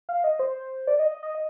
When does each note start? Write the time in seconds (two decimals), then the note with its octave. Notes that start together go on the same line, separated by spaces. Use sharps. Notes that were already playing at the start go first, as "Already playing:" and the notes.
0.09 F5
0.24 D#5
0.39 C5
0.87 D5
0.99 D#5
1.11 D#5
1.23 D#5
1.35 D#5